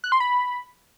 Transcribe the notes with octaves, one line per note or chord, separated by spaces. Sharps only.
F#6
C6
B5